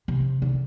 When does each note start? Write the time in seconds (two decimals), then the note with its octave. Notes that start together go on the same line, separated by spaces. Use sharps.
0.08 C3
0.42 D3